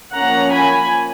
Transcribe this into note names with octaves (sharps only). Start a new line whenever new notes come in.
F3 A#3 C#4 F#5 A#5
G#5 B5